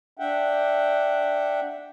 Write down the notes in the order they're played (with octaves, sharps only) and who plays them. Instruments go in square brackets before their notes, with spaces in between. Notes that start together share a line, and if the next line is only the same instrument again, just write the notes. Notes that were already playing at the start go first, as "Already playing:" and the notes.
[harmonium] D4 E5 F#5 G5